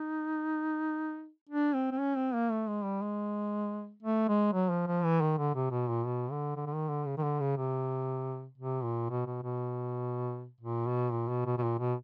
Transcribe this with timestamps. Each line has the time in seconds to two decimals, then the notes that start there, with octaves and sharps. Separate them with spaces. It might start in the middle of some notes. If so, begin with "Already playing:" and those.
Already playing: D#4
1.49 D4
1.75 C4
1.91 C4
2.00 C#4
2.17 C4
2.34 A#3
2.51 A3
2.68 G#3
2.84 G3
3.02 G#3
4.03 A3
4.29 G#3
4.53 F#3
4.71 F3
4.87 F3
5.04 E3
5.21 D#3
5.38 D3
5.55 C3
5.71 B2
5.89 A#2
6.06 B2
6.31 D3
6.56 D3
6.66 D3
6.74 D#3
6.89 D3
7.06 C#3
7.18 D#3
7.23 D3
7.40 C#3
7.57 C3
8.58 C3
8.83 A#2
9.10 B2
9.26 B2
9.43 B2
10.61 A#2
10.87 B2
11.12 A#2
11.28 B2
11.46 B2
11.58 B2
11.63 A#2
11.79 B2